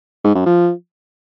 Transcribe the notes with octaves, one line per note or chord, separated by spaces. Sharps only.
G#2
F#2
F3